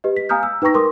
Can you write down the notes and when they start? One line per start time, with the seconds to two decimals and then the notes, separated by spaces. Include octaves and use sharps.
0.04 G4 B4 D#5
0.17 B6
0.29 F5 G#5 A#5 D#6 F6 G6
0.43 E6
0.62 D#4 B4 G5 A#5 C#6 A#6
0.74 A#4 C6 D6 D#6